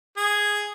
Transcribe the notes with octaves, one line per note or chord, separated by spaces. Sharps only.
G#4